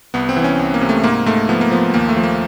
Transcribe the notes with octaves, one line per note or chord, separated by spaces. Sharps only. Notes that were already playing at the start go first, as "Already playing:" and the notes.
C2 B3
C4
E3
C#4
C2
A#3
C3
A3
G#2 A#3
G#2 A3
F3 B3
A#3
F3 B3
D#2 A#3
A3
F3
A#3